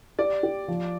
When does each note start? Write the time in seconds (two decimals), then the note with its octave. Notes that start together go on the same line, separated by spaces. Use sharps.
0.19 G4 D5
0.43 G4
0.68 F3